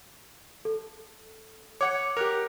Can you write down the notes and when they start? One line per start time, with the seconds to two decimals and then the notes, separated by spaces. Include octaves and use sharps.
0.65 A4
1.81 C#5 F#5 D6 G#6 C#7
2.17 G4 A#4 F#6 F7